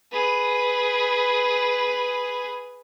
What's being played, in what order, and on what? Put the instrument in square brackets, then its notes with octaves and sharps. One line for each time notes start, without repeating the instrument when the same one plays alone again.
[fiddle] G#4 B4